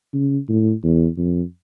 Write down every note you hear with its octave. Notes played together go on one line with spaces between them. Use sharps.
C#3
A2
E2
F2